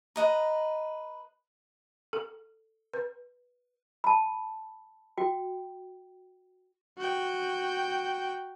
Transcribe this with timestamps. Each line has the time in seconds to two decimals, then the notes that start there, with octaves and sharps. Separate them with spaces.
0.16 B4 D#5 A#5
2.13 A4
2.94 B4
4.04 A5 B5
5.18 F#4 G5
6.98 F#4 G5